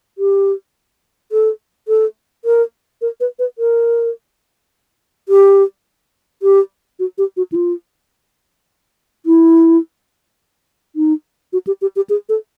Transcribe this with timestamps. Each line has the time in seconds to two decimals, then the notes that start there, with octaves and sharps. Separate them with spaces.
0.18 G4
1.32 A4
1.88 A4
2.45 A#4
3.02 A#4
3.21 B4
3.39 B4
3.59 A#4
5.29 G4
6.43 G4
6.99 F#4
7.18 G4
7.37 F#4
7.52 E4
7.56 F4
9.26 E4
10.96 D#4
11.53 F#4
11.67 G4
11.82 G4
11.96 G4
12.10 G#4
12.29 A4